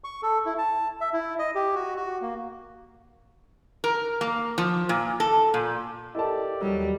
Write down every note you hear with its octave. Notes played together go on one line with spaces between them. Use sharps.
C#6
A4
E4
A5
E5
E4
D#5
G4
F#4
F#4
A#3
A#4
A#3
F3
A#2
A4
A#2
E4 G4 A4 A#4 D5 D#5 A5
D#2 F#3 G3